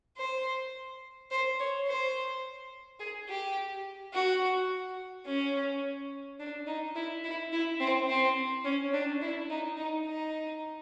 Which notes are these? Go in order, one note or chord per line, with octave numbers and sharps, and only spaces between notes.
C5
C5
C#5
C5
G#4
G4
F#4
C#4
D4
D#4
E4
E4
E4
C4
C4
C#4
D4
E4
D#4
D#4
D#4